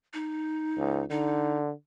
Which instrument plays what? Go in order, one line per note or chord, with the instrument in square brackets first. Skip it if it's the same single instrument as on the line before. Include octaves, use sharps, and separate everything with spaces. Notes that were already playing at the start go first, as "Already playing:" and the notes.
[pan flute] D#4
[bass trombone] C#2
[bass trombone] D3 [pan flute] D#4